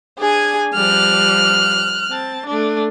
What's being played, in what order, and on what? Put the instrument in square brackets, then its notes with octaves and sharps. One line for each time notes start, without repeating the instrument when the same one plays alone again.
[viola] D4 [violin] G#4 G#5
[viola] F3 G3 [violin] F6 F#6
[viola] C4 A5
A3 D4